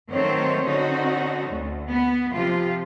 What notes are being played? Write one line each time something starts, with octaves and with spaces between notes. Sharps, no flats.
D#3 F#3 A3 C4 C5 C#5
D3 C4 C#4 D#4 F#4
D2
B3
C3 F3 F4